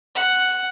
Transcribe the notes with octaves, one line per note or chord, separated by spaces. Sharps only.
F#5